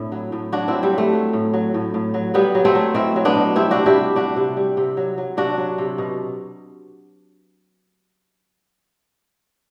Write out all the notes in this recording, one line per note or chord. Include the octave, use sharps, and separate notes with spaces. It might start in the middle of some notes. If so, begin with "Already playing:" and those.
Already playing: A2 C4 D4 E4
F#3
A2
F#3 D4 F#4
F#3 C4 E4
G3
F#3
A3
F#3
A2
F#3
A2
A2
F#3
F#3 G3 B3
F#3
A3 C4
F#3
B2 C4 E4
F#3
B3 D4
B2
G3 C4 E4
C3 D4 F#4
E4 G4
G3
G3 D4 F#4
C3
G3
C3
F#3
F#3
C3 D4 F#4
F#3
C3
B2